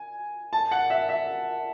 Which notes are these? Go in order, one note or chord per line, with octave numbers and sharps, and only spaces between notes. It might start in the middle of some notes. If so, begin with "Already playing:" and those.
Already playing: G#5
A5
F#5
E5
E5